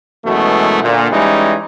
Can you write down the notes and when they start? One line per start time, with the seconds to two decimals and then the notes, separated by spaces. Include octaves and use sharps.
0.25 F#2 B2 E3 G#3 A3
0.83 D2 A#2
1.12 E3 G3 G#3 C#4 D#4